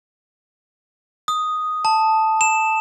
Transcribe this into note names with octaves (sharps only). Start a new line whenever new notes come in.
D#6
A5
E7